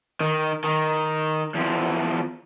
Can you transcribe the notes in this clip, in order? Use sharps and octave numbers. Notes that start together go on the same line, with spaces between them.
D#3
D#3
E2 F3